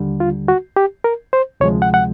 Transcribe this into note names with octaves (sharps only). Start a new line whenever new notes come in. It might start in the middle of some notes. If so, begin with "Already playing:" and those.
Already playing: D#2 D3 G3
F4
F#4
G4
A#4
C5
D2 C3 F3 G#3 C#5
F#5
F#5